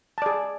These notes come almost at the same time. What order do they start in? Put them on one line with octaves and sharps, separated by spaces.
A5 D5 G#4